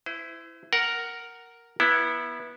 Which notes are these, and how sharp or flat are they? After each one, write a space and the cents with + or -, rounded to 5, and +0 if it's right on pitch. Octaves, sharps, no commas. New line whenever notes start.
E4 +5 C5 -40
A#4 +0 F#5 +10
B3 -20 E4 +0